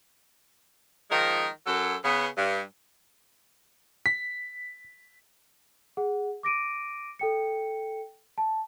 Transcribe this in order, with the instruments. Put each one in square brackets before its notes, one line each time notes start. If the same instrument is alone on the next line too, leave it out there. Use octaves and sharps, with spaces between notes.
[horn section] D#3 F3 G#3 D#4 A#4
F#2 F#3 A4
C#3 B3
G2
[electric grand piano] B6
[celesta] G#4 F#5
D6 A#6 D7 D#7
A4 G5 C#7
A5